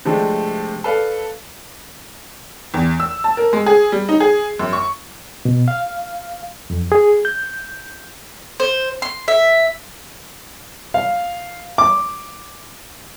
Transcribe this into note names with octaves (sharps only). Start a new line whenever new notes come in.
C3 F3 G#3 A3 C4 D4
A4 B4 D5 F5
E2
E6
A5
A#4
G#3
G#4
G3
D#4
G#4
F#2
C#6
B2
F5
F2
G#4
G6
C5
C6
E5
F5
D6